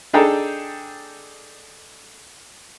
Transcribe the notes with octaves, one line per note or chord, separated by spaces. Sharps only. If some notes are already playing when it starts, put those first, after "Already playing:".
D4 D#4 G#4 A4 G5 A#5